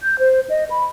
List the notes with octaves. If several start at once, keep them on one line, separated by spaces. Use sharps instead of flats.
G6
C5
D#5
B5